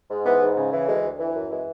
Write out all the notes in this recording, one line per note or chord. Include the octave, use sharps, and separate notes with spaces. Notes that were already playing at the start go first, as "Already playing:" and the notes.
G#2
E3 B3
G#2
C#3
E3
D2 G#3
D2
E3
F#2
E3 G#3